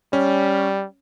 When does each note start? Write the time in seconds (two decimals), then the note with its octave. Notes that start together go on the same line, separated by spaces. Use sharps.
0.13 G3 C#4